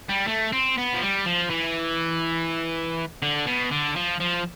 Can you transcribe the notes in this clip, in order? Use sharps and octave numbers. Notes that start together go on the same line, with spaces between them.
G3
A3
C4
B3
F3
G3
F3
E3
D3
B2
D3
F3
F3